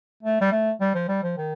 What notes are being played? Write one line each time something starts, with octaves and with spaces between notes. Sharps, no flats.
A3
G3
A3
G3
F3
G3
F3
D#3